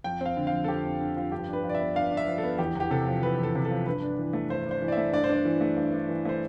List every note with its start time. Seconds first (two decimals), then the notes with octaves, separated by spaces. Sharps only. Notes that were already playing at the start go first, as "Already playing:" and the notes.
0.04 F2 G5
0.21 C4 F5
0.36 D3
0.47 F3 F5
0.64 A4
0.68 F2 G4
0.84 C4
1.01 D3
1.17 F3
1.31 G2 G4
1.48 D4 B4
1.63 F3
1.69 D5
1.75 E5
1.80 B3
1.95 G2 F5
2.11 D4
2.17 E5
2.27 F3
2.38 A4
2.43 B3
2.59 E2 G4
2.75 E2 G4
2.91 C3 A4
3.07 F3
3.22 E2 B4
3.39 E2 A4
3.55 C3
3.65 A4
3.70 F3
3.86 G2 B4
4.02 D4
4.19 E3
4.33 A3
4.50 G2 C5
4.66 D4 C5
4.82 E3
4.88 D5
4.92 A3 E5
5.13 G2 D5
5.24 C5
5.29 D4 D5
5.45 E3
5.61 A3
5.77 G2
5.92 D4
6.09 E3
6.25 A3 C5